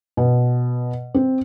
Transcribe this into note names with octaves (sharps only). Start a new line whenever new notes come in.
B2
C4